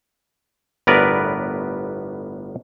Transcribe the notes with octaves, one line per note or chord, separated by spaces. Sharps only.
G1 A2 B3 A#4 B4 D5